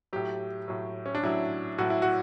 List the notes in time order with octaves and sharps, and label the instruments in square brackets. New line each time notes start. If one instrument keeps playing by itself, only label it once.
[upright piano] A2 F#3 G4
A2 F#3
C#4
D4
A2 F#3 E4
A2 F#3 F#4
E4
F#4